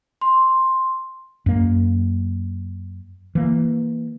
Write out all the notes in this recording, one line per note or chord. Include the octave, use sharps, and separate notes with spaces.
C6
F#2 A#3
E3 A#3